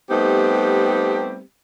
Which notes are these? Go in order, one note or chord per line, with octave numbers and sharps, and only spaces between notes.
G3 A3 B3 C4 D#4 G4